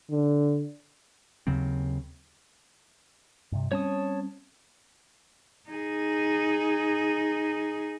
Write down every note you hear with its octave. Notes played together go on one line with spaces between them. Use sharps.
D3
D#2 C#3 F#3 C4
G2 C3
G3 C4 C#4 C#5 A5 D#6
D#4 G#4